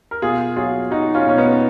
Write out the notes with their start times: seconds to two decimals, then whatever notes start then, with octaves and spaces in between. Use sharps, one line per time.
0.11 A#4
0.22 B2 F4 G#4
0.56 F#3 F4 G#4
0.91 F#3 D#4 F#4
1.15 C#4 F4
1.27 B2 C#4
1.38 B3 D#4